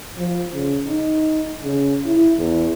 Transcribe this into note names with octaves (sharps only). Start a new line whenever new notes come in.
F3
C#3
D#4
C#3
E4
E2